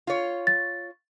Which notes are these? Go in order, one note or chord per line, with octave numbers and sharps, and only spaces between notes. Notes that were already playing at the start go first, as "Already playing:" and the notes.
F4 C#5
A6